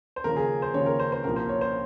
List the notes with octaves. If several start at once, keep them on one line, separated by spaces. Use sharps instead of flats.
C5
D#2 C#3 F3 A#4
G#4
C5
D#2 C#3 F3 C#5
A#4
C5
C5
C2 A#2 F3 A#4
C5
C#5
C5